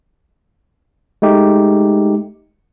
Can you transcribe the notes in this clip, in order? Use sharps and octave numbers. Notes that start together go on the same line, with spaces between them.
G#3 A3 D#4 G4